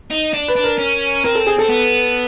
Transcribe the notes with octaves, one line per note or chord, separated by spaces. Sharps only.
D#4
D4
B4
D4
A#4
C#4
C4 A#4
A4
G#4
C4 A4
B3